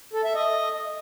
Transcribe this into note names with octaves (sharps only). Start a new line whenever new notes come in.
A4
E5
D#5